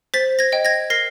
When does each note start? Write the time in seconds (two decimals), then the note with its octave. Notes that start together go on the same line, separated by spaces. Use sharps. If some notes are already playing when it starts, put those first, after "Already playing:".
0.14 C5 A6 B6
0.39 G#6 A#6
0.52 D#5 G5
0.65 G#6 A#6
0.90 A#4 A#6 C7